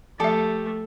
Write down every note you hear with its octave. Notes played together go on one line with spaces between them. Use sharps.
F3 A3 G4 A4 E5